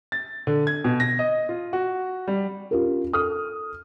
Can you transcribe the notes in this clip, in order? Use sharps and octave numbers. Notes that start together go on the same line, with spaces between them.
A6
D3
G#6
B2
A#6
D#5
F4
F#4
G3
C#4 F4 G4 A#4
A4 D#6 F6